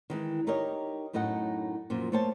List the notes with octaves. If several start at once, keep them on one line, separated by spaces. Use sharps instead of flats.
D#3 E3 G#3
D#4 G4 A#4 C#5 D#5
F#2 A2 D#4 D#5 F#5
F#2 A#2 F3
A3 A#3 C5 C#5 A5